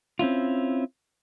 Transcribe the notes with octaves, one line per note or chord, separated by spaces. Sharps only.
C4 C#4 E4 F4